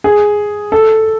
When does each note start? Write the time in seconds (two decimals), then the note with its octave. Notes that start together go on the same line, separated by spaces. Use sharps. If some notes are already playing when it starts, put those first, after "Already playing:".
0.04 G#4
0.72 A4